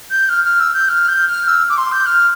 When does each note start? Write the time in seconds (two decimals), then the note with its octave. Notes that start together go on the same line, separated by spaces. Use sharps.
0.10 G6
0.28 F6
0.44 F6
0.59 E6
0.73 G6
0.88 F6
1.07 G6
1.27 F6
1.47 E6
1.69 D6
1.77 C6
1.91 G6
2.05 F6